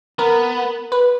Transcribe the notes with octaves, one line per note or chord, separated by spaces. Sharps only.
B3 A#4
B4